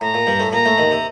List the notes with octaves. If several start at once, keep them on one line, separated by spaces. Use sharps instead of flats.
A2 A#5
A#2
G2 G3
A2 A3
A#2 A#3 A#5
A2 A3
D#2 D#3
C3